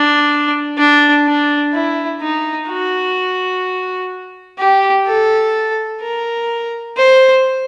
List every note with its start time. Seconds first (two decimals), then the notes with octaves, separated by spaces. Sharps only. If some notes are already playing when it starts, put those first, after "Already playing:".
Already playing: D4
0.78 D4
1.25 D4
1.73 E4
2.21 D#4
2.68 F#4
4.58 G4
5.06 A4
6.01 A#4
6.97 C5